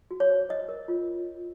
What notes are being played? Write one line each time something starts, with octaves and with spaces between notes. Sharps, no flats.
F#4
C#5
C5
C#5 D#5
A#4
F4